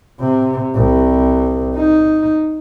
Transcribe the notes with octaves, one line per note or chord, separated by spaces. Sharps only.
C3
C2
D#4